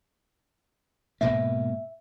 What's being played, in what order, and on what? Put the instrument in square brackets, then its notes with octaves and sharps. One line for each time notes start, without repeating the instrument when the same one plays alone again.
[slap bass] G#2 B2 A#3 [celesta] E5